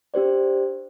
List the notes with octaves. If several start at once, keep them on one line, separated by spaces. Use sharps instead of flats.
D4 G4 C5 D5